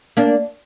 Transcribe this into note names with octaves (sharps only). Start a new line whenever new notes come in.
A#3 D4